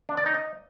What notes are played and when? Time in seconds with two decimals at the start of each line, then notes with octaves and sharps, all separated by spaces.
0.09 D4
0.17 D5
0.26 D#4
0.34 D#5